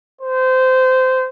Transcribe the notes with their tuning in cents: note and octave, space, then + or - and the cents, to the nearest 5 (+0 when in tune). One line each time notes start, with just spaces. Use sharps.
C5 -20